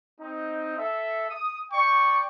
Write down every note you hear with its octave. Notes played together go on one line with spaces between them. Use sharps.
C4 D#4
A4 E5
D#6
D5 G5 C#6